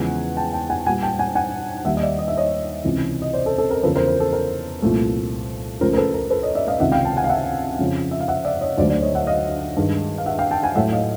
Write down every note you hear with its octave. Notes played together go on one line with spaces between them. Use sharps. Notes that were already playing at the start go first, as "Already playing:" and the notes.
Already playing: E2 C#3 F3 G#3 F#5 G#5
G5 A5
G5 A5
F#5 G#5
A#2 G3 F#5 G#5
G5 A5
F#5 G#5
F#5 G#5
D#2 D#3 G3 E5 F#5
D#5
D5 E5
D#5
E5
C#5 D#5
C#2 C3 E3
D#5
C5 D5
A4
A4
A#4
E2 C#3 F3 A4 B4
A#4 C5
A#4
A4
A#4
C2 A#2 F3 A3
C#2 C#3 F3 A3 A#4 C5
A#4
A4 B4
A#4
A4 B4
C#5 D#5
D5 E5
D#5 F5
C#2 C3 D#3 E5 F#5
F5 G5
G5 A5
F#5 G#5
F5
E5 F#5
F2 C#3 F3
E5
F5
E5 F#5
D5 E5
C#5 D#5
D2 D3 F#3 A3 C5 D5
C5 D5
C#5 D#5
E5 F#5
D#5 F5
G2 D#3 G#3
F5
E5 F#5
F5 G5
G5 A5
F#5 G#5
A2 F#3 A3 E5 F#5
D#5 F5